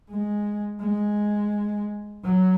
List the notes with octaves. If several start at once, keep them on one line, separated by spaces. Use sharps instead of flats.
G#3
G#3
F#3